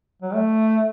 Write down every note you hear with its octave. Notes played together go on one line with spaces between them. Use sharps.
F#3
A3